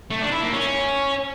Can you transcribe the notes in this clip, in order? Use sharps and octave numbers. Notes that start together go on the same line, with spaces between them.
A3
D4
E4
A#3
C#4